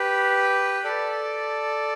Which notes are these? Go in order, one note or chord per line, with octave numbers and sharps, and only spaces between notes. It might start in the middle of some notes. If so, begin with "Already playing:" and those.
Already playing: G4 B4
A4 D5